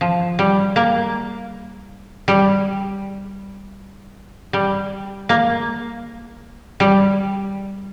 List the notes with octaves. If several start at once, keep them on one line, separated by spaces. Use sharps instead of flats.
F3
G3
A#3
G3
G3
A#3
G3